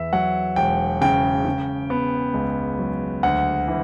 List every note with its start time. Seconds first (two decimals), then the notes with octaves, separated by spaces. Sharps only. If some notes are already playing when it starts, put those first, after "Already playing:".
Already playing: E2 E5
0.13 F#3 F#5
0.56 E1 G5
1.01 C#3 G5
1.45 C#3
1.90 B3
2.34 C#2
2.79 F#3
3.23 D2 F#5
3.68 E3